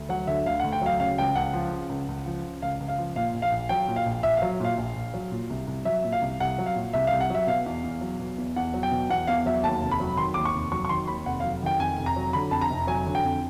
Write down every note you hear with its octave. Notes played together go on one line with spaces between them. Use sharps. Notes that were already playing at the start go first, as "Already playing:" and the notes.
Already playing: D2
F#3 F#5
D3 E5
D2 F5
D2 F#5
G5
F#3 F5
C#3 F5
C#2 G5
C#2 F#5
F3
C#3
C#2
C#2
F3
C#3
C#2 F5
C#2
F5
F3
A#2 F5
A#1
F5
A#1
F#3 G5
A#2
F5
A#1
A#1 E5
F#3 F5
A#2 F5
A#1
A#1
F#3
A#2
C2
C2
F#3 E5
A#2
F5
C2
C2 F#5
F#3
F5
A#2
C2 E5
F5
C2
F#5
F#3 E5
B2 F5
E2
E2
F#3
B2
E2
E2 F#5
F#3
G5
B2
E2 F#5
E2 F5
F#3 E5
D#2 A5
F1
B5
F#3
D#3 C6
D#2 D6
C#6
F1
F#3 C#6
C#6
D#3 C6
D#2 B5
F1 F#5
F#3 F5
D#3 G5
F2 G#5
F1
A#5
F#3
D3 B5
F2 A5
A#5
F1
F#3 G#5
D3
G5
F2